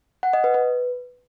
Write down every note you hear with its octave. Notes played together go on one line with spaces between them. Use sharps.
F#5
D#5
B4
B4